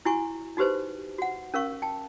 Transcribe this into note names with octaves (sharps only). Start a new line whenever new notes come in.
E4 F#4 G#5 C#6
D#4 F#4 G4 B4 C5
F#4 F#5
C#4 A#4 F5 C#6
G5 A5